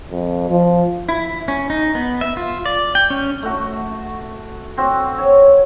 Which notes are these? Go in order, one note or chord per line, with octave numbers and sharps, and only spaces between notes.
F2
F3
E4
C#4
D#4
B3
E5
F4
D5
G5
C#4
A3 F#4
C4 F#4
C#5